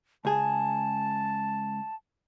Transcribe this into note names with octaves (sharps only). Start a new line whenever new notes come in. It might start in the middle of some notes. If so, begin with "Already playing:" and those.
C#2 G#4 A5